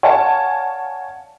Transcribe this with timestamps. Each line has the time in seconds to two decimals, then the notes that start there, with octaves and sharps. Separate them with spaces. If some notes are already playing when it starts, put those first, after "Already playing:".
0.03 C#5 D5 F5 F#5 G#5 A5